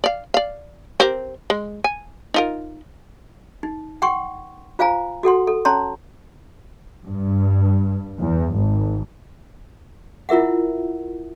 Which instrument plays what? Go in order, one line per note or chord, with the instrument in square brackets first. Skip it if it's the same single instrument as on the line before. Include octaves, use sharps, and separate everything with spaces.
[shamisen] D5 F5
D5 F5
C4 G4 A#4
G#3
G#5
D#4 F4 A#4
[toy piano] D#4
F#5 G5 C6 C#6
F4 C5 F5 G#5 A#5
F#4 A4 F#5 C6
A4
C#4 C#5 A5 A#5 C6
[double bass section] G2
E2
G#1
[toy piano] E4 F4 A#4 E5 F#5